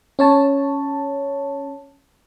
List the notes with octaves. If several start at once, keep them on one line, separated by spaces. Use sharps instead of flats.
C#4 C#5 A5